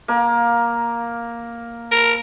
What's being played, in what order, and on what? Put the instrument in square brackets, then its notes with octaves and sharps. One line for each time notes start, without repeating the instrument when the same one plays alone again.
[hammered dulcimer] A#3
[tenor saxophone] A#4